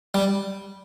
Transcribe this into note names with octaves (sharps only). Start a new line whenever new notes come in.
G3